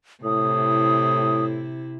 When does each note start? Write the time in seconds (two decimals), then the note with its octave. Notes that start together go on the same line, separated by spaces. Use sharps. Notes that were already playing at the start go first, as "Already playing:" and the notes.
0.24 A2 C3 E4 D#6